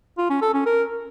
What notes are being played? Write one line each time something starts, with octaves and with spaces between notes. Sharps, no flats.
F4
C#4
A4
C#4
A#4